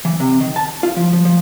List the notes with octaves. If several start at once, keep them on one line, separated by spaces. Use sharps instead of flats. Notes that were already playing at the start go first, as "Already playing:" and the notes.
E3
C3
D#3
A5
F4
F3
F3
F3